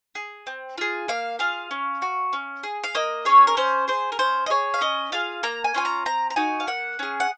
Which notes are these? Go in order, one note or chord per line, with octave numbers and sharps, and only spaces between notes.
G#4
C4
F4 G#4
A#3 F5
F4 G#4 F5
C#4
F#4
C#4
G#4
F5
A#3 D#5
C#4 G#4 C#5
A#4
C#4 C5
G#4 C5
A#4
C#4 C5
D#5
G#4 C#5
F5
C#4 D#5
F4 G#4 F5
A#3 A#5
G#5
C#4 F4 G#5
A#5
C4 A#5
A#5
D#4 F#4 G#5
F5
A#3 F#5
C#4 G#4
F#5